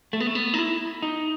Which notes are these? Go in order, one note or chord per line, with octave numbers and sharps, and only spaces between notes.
A3
B3
A3
B3
D#4
E4
D#4